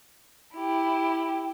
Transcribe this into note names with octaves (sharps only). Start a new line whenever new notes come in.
E4 G4